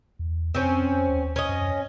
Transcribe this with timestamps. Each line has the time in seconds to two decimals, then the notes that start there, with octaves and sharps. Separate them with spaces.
0.19 E2
0.55 F2 C4 C#4 C5
1.08 D#2
1.36 C#4 D#5
1.49 F#2